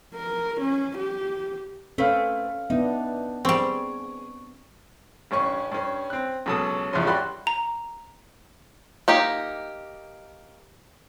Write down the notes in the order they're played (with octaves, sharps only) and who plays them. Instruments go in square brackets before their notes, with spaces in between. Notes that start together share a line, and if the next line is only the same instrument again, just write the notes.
[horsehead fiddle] A#4
C#4
G4
[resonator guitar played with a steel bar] A3 C4 B4 [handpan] C#4 [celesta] A4 F5 F6
[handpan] B3 D4 [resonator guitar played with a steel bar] D#4 [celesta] E5
[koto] G3 C4 [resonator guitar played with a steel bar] G#4 [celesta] C#6 D7
[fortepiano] A1 G2 C#4 C#6
G2 C#4
C4 F#6
C#2 B2 F#3 A4 A5 D#6
A1 E2 G2 F3 C#4 C6
G3 F#4 B5 C6 F#6
[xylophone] A#5
[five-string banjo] A#3 D#4 G4